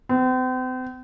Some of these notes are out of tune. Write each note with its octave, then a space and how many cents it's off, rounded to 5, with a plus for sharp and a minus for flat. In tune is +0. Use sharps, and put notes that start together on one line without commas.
C4 -40